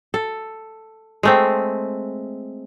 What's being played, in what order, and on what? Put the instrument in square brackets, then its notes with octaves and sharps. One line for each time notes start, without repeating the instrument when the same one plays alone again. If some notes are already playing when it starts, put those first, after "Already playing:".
[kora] A4
G#3 A3 C4